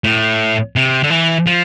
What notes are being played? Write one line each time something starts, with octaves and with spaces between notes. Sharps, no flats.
A2
C3
D3
E3
F3